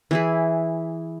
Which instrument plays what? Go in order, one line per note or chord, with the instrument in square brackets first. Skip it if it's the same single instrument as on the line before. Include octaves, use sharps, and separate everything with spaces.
[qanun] E3 E4 G#4